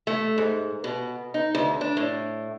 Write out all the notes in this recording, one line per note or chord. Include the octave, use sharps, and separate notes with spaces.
A3
G#2
B2
D#4
D2
D4
A2